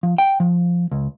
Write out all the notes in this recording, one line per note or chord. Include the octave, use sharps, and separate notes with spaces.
F3
G5
F3
C#2